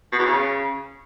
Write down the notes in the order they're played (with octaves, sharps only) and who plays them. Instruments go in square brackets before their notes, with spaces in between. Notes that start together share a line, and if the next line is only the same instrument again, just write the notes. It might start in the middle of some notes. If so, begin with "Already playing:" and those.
[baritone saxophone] B2
E2
C#3